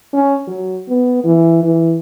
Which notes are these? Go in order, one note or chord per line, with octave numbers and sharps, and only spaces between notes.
C#4
F#3
B3
E3
E3